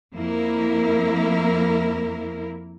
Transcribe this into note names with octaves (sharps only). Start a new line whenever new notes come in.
F2 A#3 E4 A#4